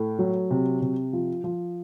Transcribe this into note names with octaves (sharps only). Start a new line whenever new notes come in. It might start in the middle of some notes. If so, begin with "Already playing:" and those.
Already playing: A2 A3
F#3
C3
C3
F3
F3